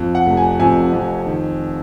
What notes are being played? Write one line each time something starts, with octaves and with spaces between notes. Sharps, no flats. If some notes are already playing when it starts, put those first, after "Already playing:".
Already playing: F2
F#5
F1
G#5
F2 G#5
F2
D#3